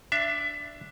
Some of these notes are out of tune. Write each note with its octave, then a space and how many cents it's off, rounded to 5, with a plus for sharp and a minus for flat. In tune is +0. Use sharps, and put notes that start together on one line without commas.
D4 +0 E5 +20